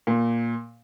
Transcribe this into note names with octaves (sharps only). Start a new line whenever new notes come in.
A#2